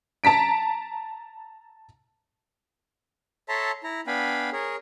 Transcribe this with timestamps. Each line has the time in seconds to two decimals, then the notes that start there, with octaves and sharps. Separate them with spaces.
0.24 A5 A#5 B6 D7
3.49 A4 C#5 E5 A5 A#5 C6
3.84 E4 A#5
4.07 B3 D4 F5 G5 G#5 B5
4.53 G#4 A#4 C#5